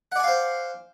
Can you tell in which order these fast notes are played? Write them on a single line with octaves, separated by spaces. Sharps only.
F#5 D5 G#5 F5 C5